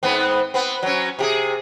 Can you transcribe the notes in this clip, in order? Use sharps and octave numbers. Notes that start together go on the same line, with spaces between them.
G#2 B3 C4
B3 C4
F#3 C#4
C3 G4 G#4